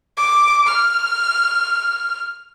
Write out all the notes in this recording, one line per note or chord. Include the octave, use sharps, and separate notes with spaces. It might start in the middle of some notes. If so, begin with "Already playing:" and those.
D6
F6